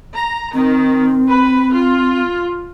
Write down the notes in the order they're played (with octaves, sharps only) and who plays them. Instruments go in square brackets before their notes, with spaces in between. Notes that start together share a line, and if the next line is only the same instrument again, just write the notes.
[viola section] A#5
[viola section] D#3 [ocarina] C4
[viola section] B4
F4